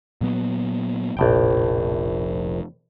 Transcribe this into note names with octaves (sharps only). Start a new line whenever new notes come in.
A#2 F#3 B3
F1 A#1 A2 G5